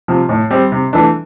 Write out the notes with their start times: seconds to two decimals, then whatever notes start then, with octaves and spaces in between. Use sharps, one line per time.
0.08 C3 F3
0.29 A2
0.51 G3 C4
0.72 C3
0.93 E3 A3 D4